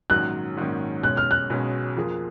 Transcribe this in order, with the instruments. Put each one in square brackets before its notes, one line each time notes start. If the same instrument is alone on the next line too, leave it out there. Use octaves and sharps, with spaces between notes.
[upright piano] A#1 G#2 D#3 F#3 C#4 [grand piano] F#6
[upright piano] A#1 G#2 D#3 F#3 C#4
[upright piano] B1 B2 G#3 C#4 [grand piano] F#6
[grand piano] F6
F#6
[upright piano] B1 B2 G#3 C#4
F2 F3 A#3 F4 G#4